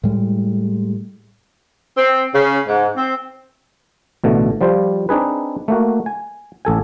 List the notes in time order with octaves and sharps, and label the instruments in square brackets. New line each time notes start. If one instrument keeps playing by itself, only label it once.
[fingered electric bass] A2 G3 G#3
[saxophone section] C4
C#3
G#2
C4
[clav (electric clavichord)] A1 B2 D3 A3
F3 G3 F4 C5
C4 D4 D#4 G#4 B4
A3 A#3 F#4
G#5
A1 A4 G#5